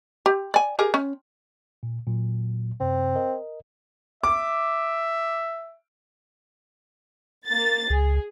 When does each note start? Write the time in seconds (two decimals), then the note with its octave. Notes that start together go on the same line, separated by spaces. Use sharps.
0.26 G4
0.54 D5 G#5
0.79 G4 G#4 A#4
0.94 C#4
1.83 A#2
2.07 A#2 F#3
2.80 F#2 C3 C4
3.15 A#4 D#5
4.23 E5 D6
7.47 A#3 A6
7.90 C#2 G#4